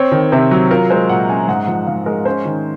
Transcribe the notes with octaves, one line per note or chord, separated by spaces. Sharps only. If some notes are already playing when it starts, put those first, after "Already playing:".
Already playing: C4 C#5
D#3
C3 C5
F#3
F4 A#4
G#3 C5
A#2 F#5
C#4 G#5
G#2 F#5
F3 F#5
G#2 F5
G#3 A#4
C#4 C5
D#3